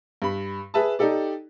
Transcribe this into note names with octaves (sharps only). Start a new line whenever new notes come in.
G2 B5
G#4 B4 E5 A5
D#4 G4 A4 D5